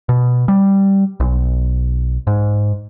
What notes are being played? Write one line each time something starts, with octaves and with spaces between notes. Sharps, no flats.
B2
G3
B1
G#2